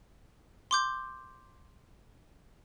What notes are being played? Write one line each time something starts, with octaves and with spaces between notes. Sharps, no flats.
C6 D6 G6